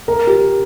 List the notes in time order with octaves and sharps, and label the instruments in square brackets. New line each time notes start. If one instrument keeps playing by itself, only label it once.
[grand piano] A#4
G4